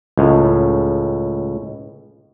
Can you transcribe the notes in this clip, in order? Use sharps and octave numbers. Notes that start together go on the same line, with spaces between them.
C#2 A2